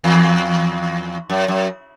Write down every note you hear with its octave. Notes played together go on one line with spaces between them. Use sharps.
E2
F#2
F#2